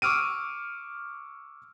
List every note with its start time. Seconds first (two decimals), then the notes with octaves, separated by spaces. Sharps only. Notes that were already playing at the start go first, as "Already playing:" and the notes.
0.02 C#6 D6 E6 F6 D7 D#7